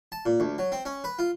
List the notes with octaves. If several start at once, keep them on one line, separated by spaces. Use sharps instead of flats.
A5
A#2
D2
F#3
C4
C#4
B4
F4